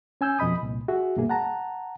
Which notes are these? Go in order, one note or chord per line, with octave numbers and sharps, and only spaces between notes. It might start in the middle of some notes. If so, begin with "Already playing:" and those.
C#4 G#5 E6 G6
F2 B2 D#5 B5 D#6
C2 A#2
F#4 G#4 E5
C2 G2 B2 A#3 G#4
F#5 A5 A#5